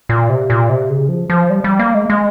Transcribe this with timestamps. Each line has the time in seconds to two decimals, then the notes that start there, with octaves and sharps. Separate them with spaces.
0.09 A#2
0.29 C3
0.50 A#2
0.69 C3
0.89 C#3
1.09 F3
1.30 F3
1.50 G3
1.64 G3
1.79 A#3
1.95 G#3
2.10 G#3